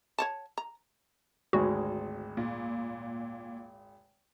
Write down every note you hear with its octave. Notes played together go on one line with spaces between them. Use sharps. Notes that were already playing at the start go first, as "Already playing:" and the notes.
C#5 F#5 A5
A#5
G#1 D2 G#3 F#4
A#2